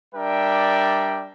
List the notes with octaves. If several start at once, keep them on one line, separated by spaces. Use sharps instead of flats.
G3 D4 A#4 D5 E5 G5